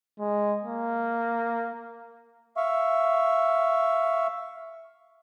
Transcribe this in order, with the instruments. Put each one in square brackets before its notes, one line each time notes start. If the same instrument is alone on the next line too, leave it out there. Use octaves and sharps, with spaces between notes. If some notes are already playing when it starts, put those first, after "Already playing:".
[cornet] G#3
A#3
[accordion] E5 F5 C#6